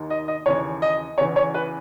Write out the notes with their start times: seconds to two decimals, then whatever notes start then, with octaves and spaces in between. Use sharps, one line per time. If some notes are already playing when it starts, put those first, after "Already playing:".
Already playing: D#2 D#3
0.10 D#5
0.28 D#5
0.46 D#2 C#3 E3 C#5
0.82 D#5
1.18 E2 C#3 E3 C#5
1.36 C#5
1.54 B4